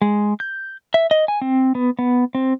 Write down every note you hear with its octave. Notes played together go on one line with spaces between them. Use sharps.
G#3
G6
E5
D#5
G#5
C4
B3
B3
C4